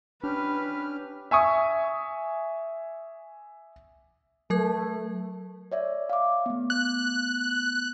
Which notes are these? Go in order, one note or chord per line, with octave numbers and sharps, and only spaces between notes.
C#4 D4 G4 B4 F6
E5 G#5 C#6 D#6
F#3 A3 A#4 G#6
C#5 D5 E5
F5 D6
A3 B3
F#6